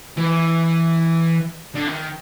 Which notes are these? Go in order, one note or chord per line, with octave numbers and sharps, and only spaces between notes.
E3
D3
D#3